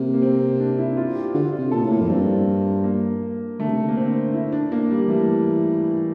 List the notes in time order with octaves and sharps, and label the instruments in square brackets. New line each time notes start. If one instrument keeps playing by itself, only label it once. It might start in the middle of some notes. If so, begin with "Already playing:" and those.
Already playing: [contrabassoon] C3 [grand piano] A#3
[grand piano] A#3
C4
D4
E4
F4
G4
[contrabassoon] D3 [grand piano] F4
[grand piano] F4
[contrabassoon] C3
[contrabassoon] A#2 [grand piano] A4
[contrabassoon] A2
[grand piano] A#3
[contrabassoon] F2
[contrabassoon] G2 [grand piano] C4
[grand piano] A#3
[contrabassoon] D3 [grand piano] A3
[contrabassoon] C3
D3
[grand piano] A#3
C4
E4
D4
A#3
G3
[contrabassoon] E3 [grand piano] A3